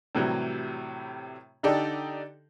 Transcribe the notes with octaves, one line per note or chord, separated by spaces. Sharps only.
A2 C3 E3 F#3 G3
D3 D4 D#4 G4 A4 D5